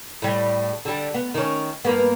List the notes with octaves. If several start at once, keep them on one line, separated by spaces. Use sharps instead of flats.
A2 G3
D3 G3
B3
D#3 C#4
G2 A#3 B3